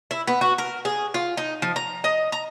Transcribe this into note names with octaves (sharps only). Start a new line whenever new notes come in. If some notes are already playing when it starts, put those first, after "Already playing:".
E4
B3
F#4
A#4
G#4
F4
D#4
F3
A#5
D#5
A#5